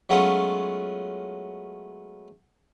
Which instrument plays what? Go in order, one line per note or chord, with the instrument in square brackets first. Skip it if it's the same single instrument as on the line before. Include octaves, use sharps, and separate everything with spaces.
[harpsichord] F#3 G#3 A3 B3 C#4 F4